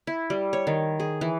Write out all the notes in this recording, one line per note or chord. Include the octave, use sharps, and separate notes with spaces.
E4
G3
C#5
D#3
G#4
E3